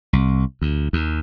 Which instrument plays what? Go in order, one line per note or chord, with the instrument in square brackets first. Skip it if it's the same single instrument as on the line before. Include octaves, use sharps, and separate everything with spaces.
[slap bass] C2
D2
D#2